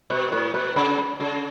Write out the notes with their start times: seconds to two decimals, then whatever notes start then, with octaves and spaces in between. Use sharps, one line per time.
0.10 B2 B4
0.32 A2 B4
0.54 B2 B4
0.76 C#3 B5
0.98 B5
1.20 C#3 A4